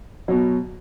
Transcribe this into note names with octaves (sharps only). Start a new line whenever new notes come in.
B2 F#3